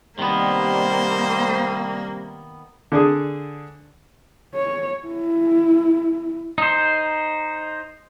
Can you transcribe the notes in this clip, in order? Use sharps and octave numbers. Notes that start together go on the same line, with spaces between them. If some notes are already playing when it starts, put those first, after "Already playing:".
C3 D#3 G3 A#3 B3 C5
D3 D4 G#4
C#5
E4
D#4 C5